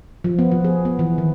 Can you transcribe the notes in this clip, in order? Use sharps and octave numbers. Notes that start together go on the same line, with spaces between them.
F3
B3
F3
G#4
B3
E3
D#3